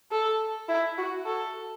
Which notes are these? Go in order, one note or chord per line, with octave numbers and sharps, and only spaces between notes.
A4
E4
F#4
A4